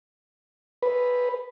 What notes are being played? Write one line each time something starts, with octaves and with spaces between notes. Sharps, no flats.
B4